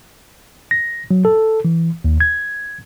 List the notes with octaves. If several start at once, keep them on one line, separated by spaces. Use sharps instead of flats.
A#6
F#3
A4
E3
D#2
G#6